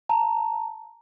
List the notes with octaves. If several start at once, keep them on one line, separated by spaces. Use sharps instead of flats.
A5 A#5